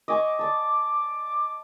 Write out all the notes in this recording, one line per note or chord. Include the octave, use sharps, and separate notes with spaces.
D#5 G#5 C#6 D6
D5 A5